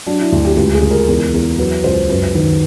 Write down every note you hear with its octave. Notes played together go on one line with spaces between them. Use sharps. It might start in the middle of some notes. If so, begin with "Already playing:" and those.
F#3 D4
E4
D2
G4
C#2 G4
G#4
C#2
A#4
E2
E2
F#3 B4
C#2 C5
F#2 B4
D#3 B4